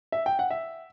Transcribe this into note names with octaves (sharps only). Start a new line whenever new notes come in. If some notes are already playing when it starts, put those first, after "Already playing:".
E5
G5
F#5
E5